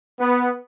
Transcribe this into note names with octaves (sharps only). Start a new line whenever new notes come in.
B3